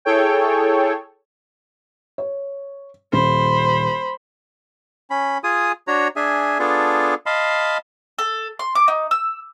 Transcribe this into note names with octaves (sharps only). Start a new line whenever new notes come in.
E4 G#4 A4 C#5 G5
C#5
D#1 C5 B5
C#4 B5
F4 G#4 G#5 D#6
D4 F#4 C#5 A#5
D4 G#4 E5 G#5
B3 D4 F4 G#4 A4
D#5 F5 A5 B5 C6
A4
C6
D6
D#4
E6